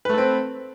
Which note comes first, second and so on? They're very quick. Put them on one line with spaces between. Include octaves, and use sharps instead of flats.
B4 A3 A4 C4